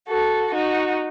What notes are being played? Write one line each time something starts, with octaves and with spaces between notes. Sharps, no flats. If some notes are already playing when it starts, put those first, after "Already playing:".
F#4 A4
D#4 F#4